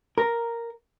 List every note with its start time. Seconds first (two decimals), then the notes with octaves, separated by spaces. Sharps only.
0.18 A#4